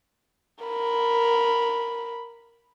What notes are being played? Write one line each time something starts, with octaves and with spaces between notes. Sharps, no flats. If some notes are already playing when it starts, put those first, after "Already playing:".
A#4 B5